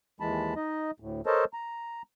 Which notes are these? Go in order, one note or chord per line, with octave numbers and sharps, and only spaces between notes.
D#2 E3 G#3 A5 B5
D#4 D#5
D2 A2
A4 A#4 C5 C#5 D#5 A5
A#5